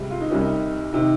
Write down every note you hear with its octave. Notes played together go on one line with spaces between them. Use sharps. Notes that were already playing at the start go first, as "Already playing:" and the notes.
Already playing: C#2 C3 G3
F4
D#4
C2 C3 G3 C#4
D#4
C3 D#3 D#4